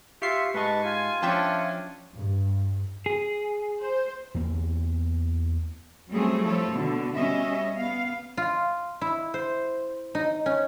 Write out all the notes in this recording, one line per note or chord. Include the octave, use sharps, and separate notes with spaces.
F4 G4 E5 C#6 C7
G#2 B4 D#5 A5 C#6
F4 G#5
F3 C#4 D4 E5 G5 A5
G2
G#4
C5
E2 A#3
F#3 G3 A3 C4 C#4 G#4
F3 E4 A4 C#5
B2 D3
G3 C#4 D#5 E5
B3 F5
F4
E4
C5
D#4
C#4